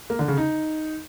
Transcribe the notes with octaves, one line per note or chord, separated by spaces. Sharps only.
A#3
D3
C#3
D#4